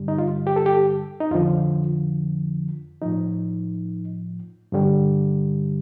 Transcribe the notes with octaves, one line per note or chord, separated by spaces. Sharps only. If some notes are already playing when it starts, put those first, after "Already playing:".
Already playing: G2 D3 G3
D#4
F4
G4
A4
G4
D#4
F2 D3 F3 F4
A2 F3 D#4
G2 D3 G3